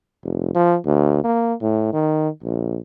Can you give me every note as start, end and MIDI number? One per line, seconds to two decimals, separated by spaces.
0.24 0.53 29
0.55 0.76 53
0.86 1.21 38
1.24 1.53 58
1.62 1.88 45
1.93 2.29 51
2.43 2.79 34